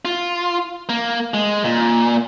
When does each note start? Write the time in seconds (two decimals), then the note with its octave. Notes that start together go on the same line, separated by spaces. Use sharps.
0.05 F4
0.89 A#3
1.34 G#3
1.64 A#2